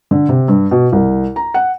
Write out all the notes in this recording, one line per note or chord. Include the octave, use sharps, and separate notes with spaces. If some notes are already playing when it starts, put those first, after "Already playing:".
D3
C3
G2
B2
C2
A#5
F#5